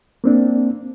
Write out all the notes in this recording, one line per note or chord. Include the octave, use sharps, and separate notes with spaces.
A#3 C4 D4